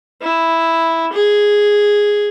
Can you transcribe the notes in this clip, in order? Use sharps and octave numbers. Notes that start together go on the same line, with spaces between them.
E4
G#4